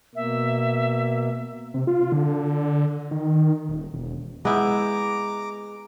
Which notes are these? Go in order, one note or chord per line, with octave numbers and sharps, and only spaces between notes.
B2 A#3 E5
C3
F4
D3
D#3
D#1
E1
G#3 B3 E4 G5 A#5 D6